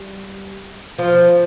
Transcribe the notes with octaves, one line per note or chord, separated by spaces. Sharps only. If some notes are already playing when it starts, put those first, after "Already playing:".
Already playing: G3
F3